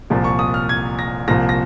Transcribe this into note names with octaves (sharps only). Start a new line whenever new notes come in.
C2 A#2 F3
C#6
D#6
F6
G#6
A#6
C2 A#2 F3 A#6
A#6